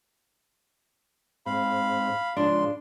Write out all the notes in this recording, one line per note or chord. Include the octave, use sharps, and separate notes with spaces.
G#2 C4 F5 B5
G#2 C#3 F3 D4 C6